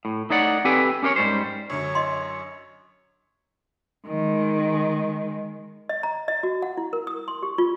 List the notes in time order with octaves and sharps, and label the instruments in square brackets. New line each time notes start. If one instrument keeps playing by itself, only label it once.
[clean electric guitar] A2
A3 D#4 C#5 D5 F#5
C4 G4 A4 B4 G5 G#5
C#4 G4 A#4 C5 C#5
G#2 G3 C5
[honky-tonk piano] F#2 D3 F#3 [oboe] C#5
[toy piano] D#5 C6
[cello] D#3 G#3
[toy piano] D#5
A#5
D#5
F#4
F#5
E4
A#4
D#6
C6
G4
F4